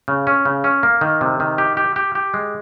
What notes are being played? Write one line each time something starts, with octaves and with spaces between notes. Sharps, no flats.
C#3
C#4
C#3
C#4
A#3
D#3
C3
D#3
G4
G4
G4
G4
G#3